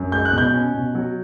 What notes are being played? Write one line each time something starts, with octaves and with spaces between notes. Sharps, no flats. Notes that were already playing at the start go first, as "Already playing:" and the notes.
Already playing: F#2
G#3 G6
F#6
B2 G6
C#4
B2
F#3